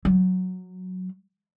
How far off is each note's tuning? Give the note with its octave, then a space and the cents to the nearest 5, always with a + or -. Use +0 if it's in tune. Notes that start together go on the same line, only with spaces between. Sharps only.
F#3 -5